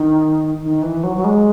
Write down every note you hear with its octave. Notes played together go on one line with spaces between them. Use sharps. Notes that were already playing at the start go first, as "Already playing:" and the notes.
Already playing: D#3
D#3
E3
F#3
F#3
G#3